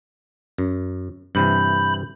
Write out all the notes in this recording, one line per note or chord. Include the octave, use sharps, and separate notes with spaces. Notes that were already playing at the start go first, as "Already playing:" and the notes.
F#2
G2 C3 E3 B5 G6